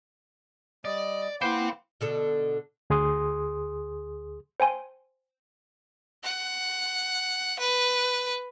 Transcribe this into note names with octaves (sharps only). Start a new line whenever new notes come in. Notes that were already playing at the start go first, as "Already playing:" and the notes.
G3 D5 D#5
A#3 E4 B4 C5 F#5 G5 C6 D6
B2 D3 A4
D2 G#4 C6 D#6
C5 G5 G#5 C6
F#5
B4